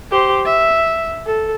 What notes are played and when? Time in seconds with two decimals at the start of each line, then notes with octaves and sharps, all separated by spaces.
0.11 G4 C5
0.45 E5
1.26 A4